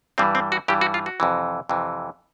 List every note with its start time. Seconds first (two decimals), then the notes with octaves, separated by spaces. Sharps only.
0.18 G2 E3 G3 C4
0.35 C4
0.52 F#4
0.68 G2 E3 G3 G4
0.81 F#4
0.94 F4
1.06 F#4
1.20 F2 C3 E3
1.69 F2 C3 E3